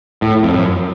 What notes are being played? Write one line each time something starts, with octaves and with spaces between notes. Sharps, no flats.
A2
F2
F#2